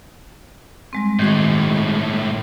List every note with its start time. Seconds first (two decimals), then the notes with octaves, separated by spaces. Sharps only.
0.93 G3 G#3 C4
1.19 A2 D#3 G#3 F#4 D#5